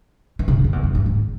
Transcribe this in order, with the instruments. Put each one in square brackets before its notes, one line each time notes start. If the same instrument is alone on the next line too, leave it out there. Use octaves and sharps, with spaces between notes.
[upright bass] E3
C#3
E2
F2
E2
F2
G2
G#2